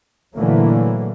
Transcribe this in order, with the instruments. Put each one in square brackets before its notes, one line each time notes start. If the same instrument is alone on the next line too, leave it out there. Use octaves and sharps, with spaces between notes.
[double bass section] A#2 D3 E3 F#3 A3 A#3